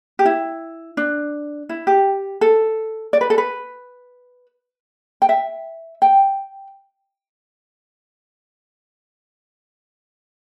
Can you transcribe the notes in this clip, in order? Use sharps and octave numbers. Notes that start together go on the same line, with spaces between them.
G4
E4
D4
E4
G4
A4
D5
B4
A4
B4
G5
E5
G5